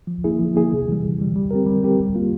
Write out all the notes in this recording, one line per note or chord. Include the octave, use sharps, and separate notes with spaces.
F3
A#3 E4 G#4
F3
A#3 E4 G#4
C3
E3 G3
C3
E3 G3
G3
C4 G4 A#4
G3
C4 G4 A#4
G3
A#3 F4